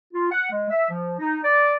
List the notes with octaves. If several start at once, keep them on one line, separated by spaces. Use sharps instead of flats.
F4
F#5
G#3
E5
F3
D#4
D5